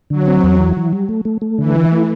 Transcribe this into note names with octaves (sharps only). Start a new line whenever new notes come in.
D3 F#3
C4
E2
E3
E3
G3
A3
A3
A3
D3 E3
E4
A3